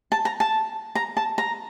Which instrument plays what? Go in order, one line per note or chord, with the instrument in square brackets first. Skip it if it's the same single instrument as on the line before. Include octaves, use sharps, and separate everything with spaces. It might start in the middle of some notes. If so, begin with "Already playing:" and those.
[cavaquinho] A5
A#5
A5
A#5
A5
A#5